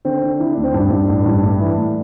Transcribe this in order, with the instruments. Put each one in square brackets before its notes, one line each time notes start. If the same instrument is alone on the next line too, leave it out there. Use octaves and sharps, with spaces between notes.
[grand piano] D3 C4
D3
D3 E4
D4
D2
C4
G2 D4
G2
A1
G2
A2
E3
A2